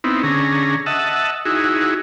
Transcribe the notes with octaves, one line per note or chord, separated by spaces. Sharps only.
B3 C4 D#4 E4
D3 C#4 G#4 A#5
D#5 E5 F#5 A5
D#4 E4 F#4 G#4